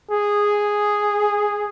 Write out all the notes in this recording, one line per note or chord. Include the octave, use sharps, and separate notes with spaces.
G#4